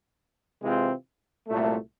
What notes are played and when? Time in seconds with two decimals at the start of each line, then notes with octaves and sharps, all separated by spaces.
0.62 C3 E3 G#3 C4 F4
1.47 C2 A#2 F#3 A3